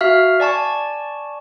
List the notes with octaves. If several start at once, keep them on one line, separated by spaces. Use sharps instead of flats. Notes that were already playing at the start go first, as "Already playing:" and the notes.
F#4 E5 F5 F6
D5 G#5 A5 C#6